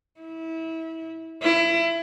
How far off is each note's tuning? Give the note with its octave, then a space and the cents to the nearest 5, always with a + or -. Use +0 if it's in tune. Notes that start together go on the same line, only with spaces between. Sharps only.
E4 -25
E4 +25